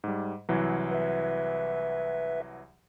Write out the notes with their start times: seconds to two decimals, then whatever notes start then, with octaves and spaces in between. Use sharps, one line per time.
0.04 G#2 G3
0.49 C2 E3 F#3
0.91 B4 E5